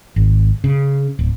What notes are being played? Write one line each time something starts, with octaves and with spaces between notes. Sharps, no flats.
G#1
C#3
D1